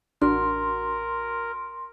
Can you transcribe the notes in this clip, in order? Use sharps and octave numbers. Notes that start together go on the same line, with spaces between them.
A1 D4 F#4 A#4 C6